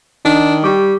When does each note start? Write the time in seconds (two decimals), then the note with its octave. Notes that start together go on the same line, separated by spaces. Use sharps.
0.25 D#3 D4 D#4
0.64 G3 G4 C#6 D6